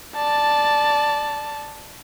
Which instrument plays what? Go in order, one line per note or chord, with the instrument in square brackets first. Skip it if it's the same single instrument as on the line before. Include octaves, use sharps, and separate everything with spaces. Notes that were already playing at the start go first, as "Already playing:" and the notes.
[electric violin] D5 A5